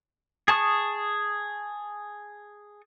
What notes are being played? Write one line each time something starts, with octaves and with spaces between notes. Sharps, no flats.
G#4 A5 C#6 D#6